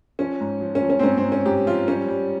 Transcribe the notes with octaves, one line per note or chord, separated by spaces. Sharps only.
F3 C#4
G#2
F3
C#4
F3
C#4
C4
G#2 C#4
C4
G#2
C#4
G#2 G4
F3 F4
G3 C#4
G3